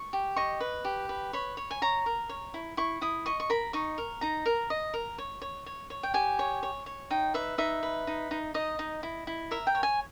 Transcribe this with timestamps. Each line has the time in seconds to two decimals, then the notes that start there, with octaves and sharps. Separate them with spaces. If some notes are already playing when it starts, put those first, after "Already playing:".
Already playing: C#6
0.13 G4
0.36 D#5 C#6
0.61 B4
0.85 G4
1.09 B4
1.33 C#5 B5
1.57 C#5
1.71 G#5
1.82 C#5 A#5
2.06 A#4
2.29 C#5
2.54 E4
2.77 E4 C#6
3.01 E4 D#6
3.26 D#5 C#6
3.40 C#6
3.50 A#4 B5
3.73 D#4 C#6
3.98 A#4
4.21 D#4 A#5
4.46 A#4
4.70 D#5
4.94 A#4
5.18 C#5
5.42 C#5
5.66 C#5
5.90 C#5
6.03 G5
6.14 G4 G#5
6.39 C#5
6.63 C#5
6.86 C#5
7.11 D#4 G5
7.34 B4 E5
7.58 D#4 E5
7.83 B4
8.07 D#4
8.31 D#4
8.54 D#4 D#5
8.79 D#4
9.03 E4
9.27 E4
9.51 A#4 E5
9.67 G5
9.75 C#5
9.83 G#5